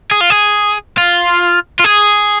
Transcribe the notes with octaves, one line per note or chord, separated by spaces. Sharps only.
G#4
F4
G#4
F4
F4
G#4